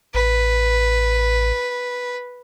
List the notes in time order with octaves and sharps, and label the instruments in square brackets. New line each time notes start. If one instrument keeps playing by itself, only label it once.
[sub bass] A1 [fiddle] B4